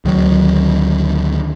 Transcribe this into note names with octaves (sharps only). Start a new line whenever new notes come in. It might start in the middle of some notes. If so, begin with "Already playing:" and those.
D2 D#3 F#3